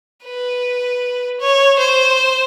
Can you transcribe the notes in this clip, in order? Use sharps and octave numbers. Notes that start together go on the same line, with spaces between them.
B4
C#5
C5